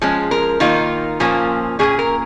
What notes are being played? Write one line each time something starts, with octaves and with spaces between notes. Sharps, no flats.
F3 G#3 C#4
A#4
D#3 A#3 D#4 F4
A#2 F3 A#3 C#4
A#2 F3 A#3 C#4 G#4
A#4